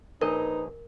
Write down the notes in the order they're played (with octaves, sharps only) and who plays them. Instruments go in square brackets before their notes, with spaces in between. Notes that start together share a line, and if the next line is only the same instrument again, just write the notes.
[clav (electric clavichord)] A#1 D#5 [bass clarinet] D#4 [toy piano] A#4 [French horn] B4